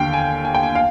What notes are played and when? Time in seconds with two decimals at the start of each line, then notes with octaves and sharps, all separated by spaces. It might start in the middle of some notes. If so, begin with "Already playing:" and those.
Already playing: D#2 D3 F5 G5
0.13 G#5
0.45 G#5
0.54 G5
0.63 G#5
0.75 F5